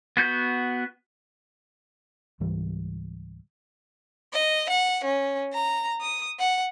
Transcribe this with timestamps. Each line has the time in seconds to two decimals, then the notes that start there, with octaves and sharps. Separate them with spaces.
0.17 B3 F#4 G6
2.40 C#2 G#2 E3 G3
4.34 D#5
4.69 F#5
5.04 C#4
5.54 A#5
6.01 D#6
6.39 F#5